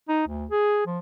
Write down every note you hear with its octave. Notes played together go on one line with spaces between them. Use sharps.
D#4
D2
G#4
F3